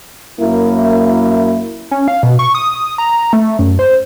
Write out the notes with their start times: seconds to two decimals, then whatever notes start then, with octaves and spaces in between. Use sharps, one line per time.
0.40 F#2 A#3 E4
1.91 C#4
2.08 F5
2.23 B2
2.39 C#6
2.55 D#6
2.98 A#5
3.33 A3
3.59 F#2
3.79 C5